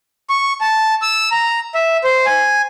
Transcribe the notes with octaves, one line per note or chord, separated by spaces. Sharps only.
C#6
A5
E6
A#5
E5
C5
G#5